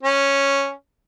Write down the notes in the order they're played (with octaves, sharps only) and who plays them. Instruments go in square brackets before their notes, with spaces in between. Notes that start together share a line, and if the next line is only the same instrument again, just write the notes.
[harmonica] C#4